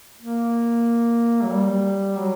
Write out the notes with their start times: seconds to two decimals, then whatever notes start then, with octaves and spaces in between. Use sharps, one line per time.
0.19 A#3
1.44 F#3
1.52 G3
2.17 F#3